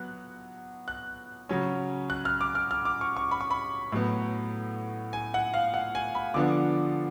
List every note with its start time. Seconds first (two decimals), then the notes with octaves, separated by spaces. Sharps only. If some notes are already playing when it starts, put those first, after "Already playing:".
Already playing: F#3 B3 F#6
0.88 F#6
1.49 C#3 F#3 C#4
2.10 F#6
2.25 F6
2.41 D6
2.55 F6
2.71 F6
2.85 D6
3.01 C#6
3.17 C#6
3.31 B5
3.41 C#6
3.51 B5
3.92 A2 F#3 B3
5.13 G#5
5.34 F#5
5.54 F5
5.74 F#5
5.95 G#5
6.15 B5
6.34 D3 F3 B3 D4 D6